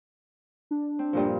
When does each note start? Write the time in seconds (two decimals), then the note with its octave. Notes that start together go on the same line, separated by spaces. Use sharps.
0.71 D4
0.99 C4
1.13 G2 A#2 F3